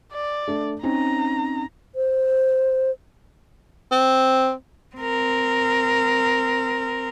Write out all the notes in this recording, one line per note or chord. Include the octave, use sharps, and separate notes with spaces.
D5
A3 D4
C4 C#4 D#4 A#5
C5
C4
C4 A#4